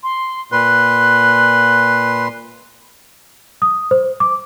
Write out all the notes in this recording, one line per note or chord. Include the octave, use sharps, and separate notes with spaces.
C6
A#2 B4 C6 F#6
D#6
C5
D6